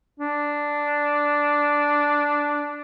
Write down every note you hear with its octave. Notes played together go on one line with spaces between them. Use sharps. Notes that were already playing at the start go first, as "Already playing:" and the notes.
D4